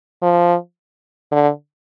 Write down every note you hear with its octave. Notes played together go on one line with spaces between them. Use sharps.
F3
D3